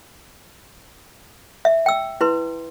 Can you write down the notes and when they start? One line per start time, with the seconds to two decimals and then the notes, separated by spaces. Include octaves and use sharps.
1.65 E5
1.86 G5 E6
2.21 E4 B4 C6